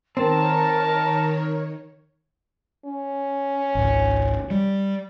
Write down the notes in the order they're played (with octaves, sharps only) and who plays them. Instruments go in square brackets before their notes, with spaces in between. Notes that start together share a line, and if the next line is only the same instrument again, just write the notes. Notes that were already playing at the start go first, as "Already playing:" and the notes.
[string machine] D#3 C#5 [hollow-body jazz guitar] C4 [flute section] A#4 [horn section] A5
[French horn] C#4
[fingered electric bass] G#1 C#2
G3